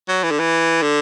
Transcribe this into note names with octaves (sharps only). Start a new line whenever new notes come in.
F#3
E3
D3
E3
D3